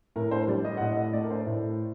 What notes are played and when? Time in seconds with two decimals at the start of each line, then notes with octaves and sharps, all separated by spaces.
0.16 A2 A#4
0.31 C5
0.48 G3 D5
0.65 D#5
0.77 F#5
0.81 A2 D#5
0.97 D#5
1.13 A3 D5
1.24 A#4
1.30 C5
1.46 A2